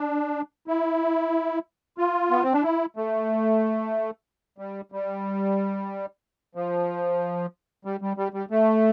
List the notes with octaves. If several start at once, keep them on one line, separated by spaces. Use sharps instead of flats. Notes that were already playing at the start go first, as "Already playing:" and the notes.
Already playing: D4
E4
F4
B3
C4
D4
E4
A3
G3
G3
F3
G3
G3
G3
G3
A3